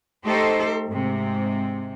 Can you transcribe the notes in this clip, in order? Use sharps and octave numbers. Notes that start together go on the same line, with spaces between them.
A3 D#4 G4 A4 C5 D#5
G#2 C3